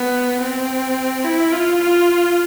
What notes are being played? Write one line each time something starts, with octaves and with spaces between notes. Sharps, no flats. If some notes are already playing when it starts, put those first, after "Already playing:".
Already playing: B3
C4
E4
F4
F4